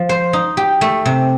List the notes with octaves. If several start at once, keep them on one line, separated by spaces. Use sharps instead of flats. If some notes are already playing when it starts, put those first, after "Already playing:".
Already playing: F3
C5
D#4
G4
A3
C3